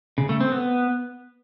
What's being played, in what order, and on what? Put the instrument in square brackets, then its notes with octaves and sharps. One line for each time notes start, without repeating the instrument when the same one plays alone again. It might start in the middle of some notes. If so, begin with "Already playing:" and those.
[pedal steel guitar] C#3
A3
C4
B3